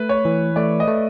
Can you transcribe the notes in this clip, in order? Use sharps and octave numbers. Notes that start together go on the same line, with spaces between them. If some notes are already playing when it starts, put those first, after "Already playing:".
Already playing: A3 B4
C#5
E3
A3 D5
D#5
A3